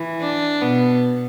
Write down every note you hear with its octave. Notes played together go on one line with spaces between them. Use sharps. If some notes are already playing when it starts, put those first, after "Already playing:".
Already playing: E3
D4
B2 B3